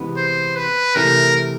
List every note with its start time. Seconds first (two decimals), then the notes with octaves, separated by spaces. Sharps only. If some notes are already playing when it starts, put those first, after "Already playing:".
Already playing: C3 E3 G#3 B3
0.16 C5
0.55 B4
0.95 C3 E3 A3 A#4